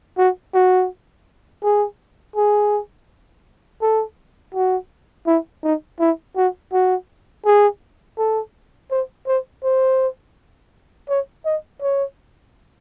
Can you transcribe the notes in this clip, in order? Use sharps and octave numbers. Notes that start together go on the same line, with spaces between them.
F#4
F#4
G#4
G#4
A4
F#4
E4
D#4
E4
F#4
F#4
G#4
A4
C5
C5
C5
C#5
D#5
C#5